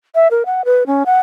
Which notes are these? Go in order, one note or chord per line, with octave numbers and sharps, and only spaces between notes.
E5
A#4
F#5
B4
C#4
F#5